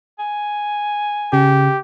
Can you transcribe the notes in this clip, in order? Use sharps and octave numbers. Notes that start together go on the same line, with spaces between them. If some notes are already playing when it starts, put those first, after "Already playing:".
G#5
C#3 G4